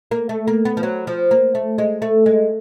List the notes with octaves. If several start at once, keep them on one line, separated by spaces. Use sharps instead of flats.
A#3
A3
A#3
B3
F3
F#3
F3
A#3
A3
G#3
A3
G#3